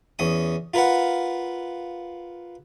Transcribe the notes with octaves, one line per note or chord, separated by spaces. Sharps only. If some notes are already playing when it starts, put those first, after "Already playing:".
E2 C#4 D#6
F4 A#4 B4 F5 F#5